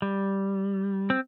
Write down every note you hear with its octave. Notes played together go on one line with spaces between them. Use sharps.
G3
C4